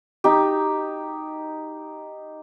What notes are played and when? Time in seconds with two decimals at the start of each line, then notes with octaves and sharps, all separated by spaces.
0.24 D#4 G4